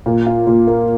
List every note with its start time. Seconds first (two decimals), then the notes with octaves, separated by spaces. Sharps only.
0.06 A#2
0.26 F4
0.47 A#2
0.67 A#3